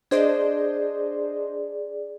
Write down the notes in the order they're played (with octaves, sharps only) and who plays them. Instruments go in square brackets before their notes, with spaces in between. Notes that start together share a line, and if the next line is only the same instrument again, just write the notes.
[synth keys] D4 C5 D#5 [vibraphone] G#4 D5